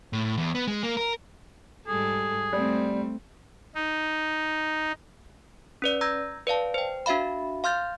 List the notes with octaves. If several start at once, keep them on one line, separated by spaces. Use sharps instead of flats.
A2
E2
B3
G#3
A#3
A#4
G#2 G3 G#4 A4
G3 A3 C4
D#4
C#4 B4 D5
A#5 E6 G6 G#6 A#6
B4 D5 F5 A5
C5 G5
D4 F#4 E5 F5 B5
F5 C6 F6 G6 A6